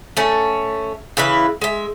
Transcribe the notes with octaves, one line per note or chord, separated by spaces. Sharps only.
A3 C#4
C#3 E3 E4 B4
G#3 E5